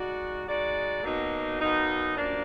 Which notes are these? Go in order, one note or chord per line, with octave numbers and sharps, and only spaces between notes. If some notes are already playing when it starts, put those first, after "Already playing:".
Already playing: G#3 D#4 F#4 D5
G#3 D#4 F#4 D5
B2 F#3 A#3 D#4
B2 F#3 A#3 D#4
F#2 F3 A#3 D4